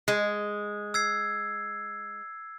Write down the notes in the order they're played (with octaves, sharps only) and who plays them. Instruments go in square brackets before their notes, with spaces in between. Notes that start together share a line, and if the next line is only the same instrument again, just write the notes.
[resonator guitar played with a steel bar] G#3
[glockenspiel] E6 G#6 C7